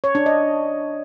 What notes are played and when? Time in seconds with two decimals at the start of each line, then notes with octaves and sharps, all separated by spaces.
0.04 C#5
0.15 D4
0.26 D#5